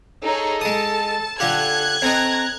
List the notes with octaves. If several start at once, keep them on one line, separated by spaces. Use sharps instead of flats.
D#4 G#4 A4 C#5
G#3 A5 D#6
D3 F4 G4 A4 F#6 G#6
C4 A4 D#5 A#5